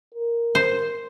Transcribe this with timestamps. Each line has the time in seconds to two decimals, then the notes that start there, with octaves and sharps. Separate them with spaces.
0.14 A#4
0.55 C5